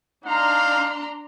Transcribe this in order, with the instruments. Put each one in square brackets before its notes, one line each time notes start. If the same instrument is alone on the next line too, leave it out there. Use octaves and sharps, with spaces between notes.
[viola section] D4 A#5 C6 [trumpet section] D#4 F5